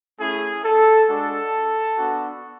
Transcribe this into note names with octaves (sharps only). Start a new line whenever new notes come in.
A3 C#4 E4 G#4
A4
G#3 D4 F#4 A4
B3 D4 F#4